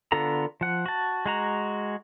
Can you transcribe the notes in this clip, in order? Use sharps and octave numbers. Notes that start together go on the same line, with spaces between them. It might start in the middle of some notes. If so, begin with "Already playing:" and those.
D3 B3 F4 A4 A#5
F3 F#5
F#4 A5
G#3 F#4 A#5